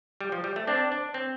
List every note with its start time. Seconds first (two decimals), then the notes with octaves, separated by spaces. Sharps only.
0.21 G3
0.32 F3
0.44 G3
0.56 A3
0.67 C4 D4
0.92 D4
1.14 C4